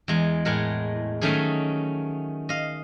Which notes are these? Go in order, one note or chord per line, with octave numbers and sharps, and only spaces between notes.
E2 G#3
A2 G#3 A#4 F#5
D#3 F#3 A3 C#4 D#4 G#4
D#5 F5